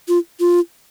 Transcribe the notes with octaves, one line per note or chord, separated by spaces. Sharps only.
F4
F4